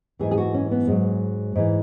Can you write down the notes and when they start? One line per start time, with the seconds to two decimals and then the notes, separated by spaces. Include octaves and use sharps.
0.19 G#2 E3 G#4
0.31 G#4
0.38 F#4
0.54 C#4
0.71 B3
0.87 G#2 F#3 G#3
1.56 G#2 E3